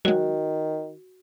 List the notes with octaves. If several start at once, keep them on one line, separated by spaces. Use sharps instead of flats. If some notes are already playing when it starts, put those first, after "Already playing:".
D#3 F#3 G#3 F#4